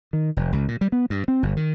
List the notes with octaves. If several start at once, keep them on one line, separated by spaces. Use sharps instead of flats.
D#3
F1
C#2
A#2
G3
B3
G2
C4
G1
D#3